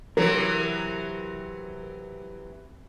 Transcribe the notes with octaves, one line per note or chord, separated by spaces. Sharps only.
C3 E3 F#3 A#4